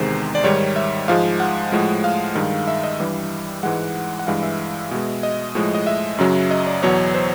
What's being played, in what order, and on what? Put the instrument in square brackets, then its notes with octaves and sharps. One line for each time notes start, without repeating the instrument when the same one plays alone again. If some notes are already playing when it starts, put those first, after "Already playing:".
Already playing: [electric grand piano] E2 C3 D#3 G#3 C5
D5
G#2 D#3 G3 C#5
E5
G#2 F3 G#3 F5
F#5
A2 F3 G#3
F5
G2 D#3 G#3
E5
D#5
G2 E3 G3
G#2 E3 G#3 F#5
F#5
G2 E3 G#3 F5
E5
B2 G#3
D#5
A2 F3 G#3
D#5
E5
F#2 C#3 F#3
D#5
D5
E2 B2 F#3 C#5
C5